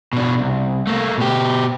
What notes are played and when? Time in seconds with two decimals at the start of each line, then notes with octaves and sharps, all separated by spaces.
0.13 B2 D4
0.40 C2
0.87 A3 A#3
1.18 B2 G4